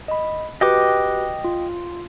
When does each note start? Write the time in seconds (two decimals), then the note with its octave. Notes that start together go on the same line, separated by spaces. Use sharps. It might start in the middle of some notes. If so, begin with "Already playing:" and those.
0.08 D#5 B5
0.61 F#4 G4 B4 D#5 G5 D6
1.44 F4